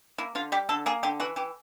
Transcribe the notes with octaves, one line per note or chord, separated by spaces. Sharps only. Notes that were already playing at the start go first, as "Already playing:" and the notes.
A#3 E4
D3 F4
G3 G4
D3 A4
A#3 G#4
D3 G4
E3 F#4
E3 G4